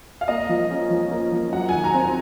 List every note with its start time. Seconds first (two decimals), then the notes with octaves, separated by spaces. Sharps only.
0.21 F5
0.28 A#3 D#5
0.49 F3
0.71 C#4
0.90 F3
1.11 A#3
1.32 F3
1.53 F#3 F#5
1.69 D#3 G#5
1.84 A#5
1.94 C4
2.00 G#5